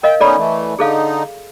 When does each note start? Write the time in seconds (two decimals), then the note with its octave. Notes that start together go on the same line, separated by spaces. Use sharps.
0.03 A#4 D#5 F5 G5
0.21 B3 C#4 D#4 A4 D5 B5
0.38 E3 A3
0.79 D3 D#4 G#4 A4 F5